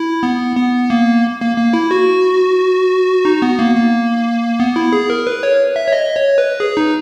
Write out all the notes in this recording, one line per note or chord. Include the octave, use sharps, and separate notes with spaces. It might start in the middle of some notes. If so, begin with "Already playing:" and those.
Already playing: E4
B3
B3
A#3
A#3
A#3
E4
F#4
D#4
B3
A#3
A#3
B3
E4
G#4
A#4
B4
C#5
E5
C#5
D#5
C#5
B4
G#4
D#4